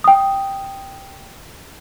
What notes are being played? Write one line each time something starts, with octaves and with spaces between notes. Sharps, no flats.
G5 D#6